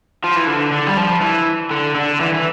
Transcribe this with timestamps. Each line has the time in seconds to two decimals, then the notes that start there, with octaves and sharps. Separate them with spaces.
0.24 F3
0.36 E3
0.47 D3
0.72 D3
0.86 G3
0.97 F3
1.21 E3
1.71 D3
1.95 D3
2.21 E3
2.34 E3